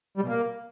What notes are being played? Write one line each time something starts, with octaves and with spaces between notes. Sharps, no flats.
G3
B2
A#3